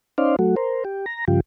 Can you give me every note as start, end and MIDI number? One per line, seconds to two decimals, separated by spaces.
0.18 0.36 61
0.18 0.36 63
0.18 0.36 72
0.18 0.36 74
0.18 0.36 77
0.39 0.55 54
0.39 0.55 57
0.39 0.55 66
0.56 0.84 70
0.56 0.84 72
0.85 1.06 67
1.06 1.25 82
1.28 1.40 43
1.28 1.40 49
1.28 1.40 53
1.28 1.40 65
1.28 1.40 67